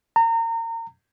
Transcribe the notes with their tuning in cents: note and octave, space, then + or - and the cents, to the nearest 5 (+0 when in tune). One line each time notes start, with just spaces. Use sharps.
A#5 -30